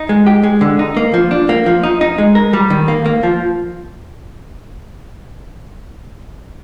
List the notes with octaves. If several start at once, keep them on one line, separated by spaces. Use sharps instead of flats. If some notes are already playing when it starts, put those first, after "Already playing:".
Already playing: D#4
G#3
G4
G#3
D3
D#4
A#3
F3
D4
A#3
F3
D#4
D#4
G#3
A#4
G3
D#3
A#3
A#3
F3